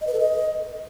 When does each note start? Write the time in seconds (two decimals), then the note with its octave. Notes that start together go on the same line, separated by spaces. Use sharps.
0.01 D#5
0.07 B4
0.13 A4
0.20 D#5